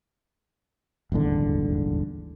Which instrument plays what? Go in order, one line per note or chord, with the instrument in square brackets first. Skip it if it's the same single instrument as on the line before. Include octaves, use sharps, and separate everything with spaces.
[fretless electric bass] D#1 G#1 E2 D3